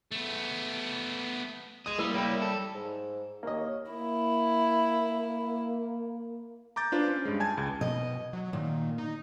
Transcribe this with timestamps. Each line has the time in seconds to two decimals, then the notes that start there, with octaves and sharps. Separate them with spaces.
0.11 A3 B3
1.86 G#4 D#5 D#7
1.98 G3 A#3 E4 E6
2.14 A#3 E4 C#5 G5 B5
2.42 A4
2.74 G#2
3.43 D#2 A#3 C#5 D#5
3.92 A#3 E4
6.76 A#5 D6 G6 A6
6.92 D4 F4 B4 C5
7.08 C#4
7.25 G2 G#3
7.40 G#5 A5 G#6
7.57 C#2
7.81 B2 D#5
8.33 F#3
8.53 A#2 D#3
8.98 D#4